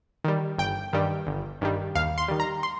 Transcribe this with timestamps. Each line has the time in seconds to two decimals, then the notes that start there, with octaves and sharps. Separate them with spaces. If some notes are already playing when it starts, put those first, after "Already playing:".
0.24 D#3 G3
0.58 G1 G5
0.93 G2 D#3 G3
1.27 G1
1.61 G2 D#3 G3
1.95 D#2 F5
2.18 C6
2.28 D#3 G3
2.40 A#5
2.63 C6